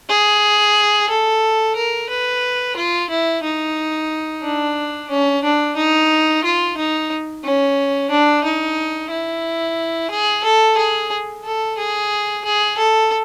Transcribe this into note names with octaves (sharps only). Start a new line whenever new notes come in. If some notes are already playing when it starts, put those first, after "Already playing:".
G#4
A4
A#4
B4
F4
E4
D#4
D4
C#4
D4
D#4
F4
D#4
C#4
D4
D#4
E4
G#4
A4
G#4
A4
G#4
G#4
A4